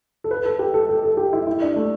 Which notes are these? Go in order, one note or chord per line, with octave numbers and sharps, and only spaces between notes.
A4
B4
A4
G4
A4
A4
A4
G4
E4
E4
D4
A3